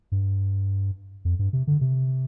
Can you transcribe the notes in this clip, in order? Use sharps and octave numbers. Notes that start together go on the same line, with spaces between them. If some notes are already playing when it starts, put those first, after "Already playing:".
G2
F2
G2
C3
D3
C3